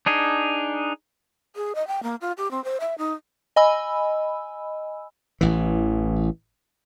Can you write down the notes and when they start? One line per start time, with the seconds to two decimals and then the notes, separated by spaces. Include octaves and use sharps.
0.06 D4 D#4 G#4
1.56 G#4
1.75 D#5
1.88 G5
2.03 A#3
2.21 F4
2.38 G4
2.51 C4
2.64 C5
2.80 E5
2.98 D#4
3.56 D#5 G#5 B5 E6
5.41 A1 E3